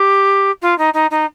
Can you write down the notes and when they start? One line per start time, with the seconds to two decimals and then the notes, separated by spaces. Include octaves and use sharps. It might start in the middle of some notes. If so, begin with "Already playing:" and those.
Already playing: G4
0.62 F4
0.78 D#4
0.94 D#4
1.11 D#4